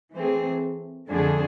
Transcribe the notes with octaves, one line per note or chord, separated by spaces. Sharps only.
E3 A3 C4 G#4
F2 D3 A3 D4 G#4